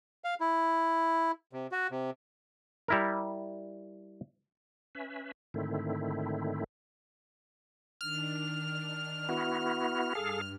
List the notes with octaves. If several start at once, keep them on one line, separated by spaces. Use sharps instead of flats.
F5
E4
C3
F#4
C3
G3 E4 A#4
C#4 B4 E5
G#2 D3 D#3 A3 C4 E4
D#3 D4 F6
B3 E4 F#4
G2 G#4 A4 F5